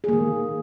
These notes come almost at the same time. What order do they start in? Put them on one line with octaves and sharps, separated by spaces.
G#4 A#3 D#3